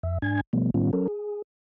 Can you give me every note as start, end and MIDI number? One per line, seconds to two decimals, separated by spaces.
0.03 0.18 41
0.03 0.18 76
0.22 0.41 44
0.22 0.41 62
0.22 0.41 80
0.22 0.41 92
0.53 0.70 47
0.53 0.70 53
0.53 0.70 55
0.53 0.70 57
0.53 0.70 59
0.74 0.91 45
0.74 0.91 51
0.74 0.91 55
0.74 0.91 59
0.74 0.91 61
0.74 0.91 65
0.93 1.07 54
0.93 1.07 61
0.93 1.07 69
0.93 1.07 70
1.08 1.42 68